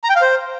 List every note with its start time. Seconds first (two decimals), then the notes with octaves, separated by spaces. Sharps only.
0.04 A#5
0.10 G5
0.16 F5
0.22 C5